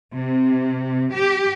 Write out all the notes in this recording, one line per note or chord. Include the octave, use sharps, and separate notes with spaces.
C3
G4